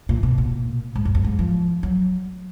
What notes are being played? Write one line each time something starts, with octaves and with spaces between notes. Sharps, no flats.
A#2
B2
A#2
G#2
F#2
F2
G#2
F3
F#3